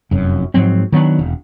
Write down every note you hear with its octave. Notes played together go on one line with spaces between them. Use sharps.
F1 F#2
G#2 F3 F#3 C4
D#3 F#3 B3 D4
E1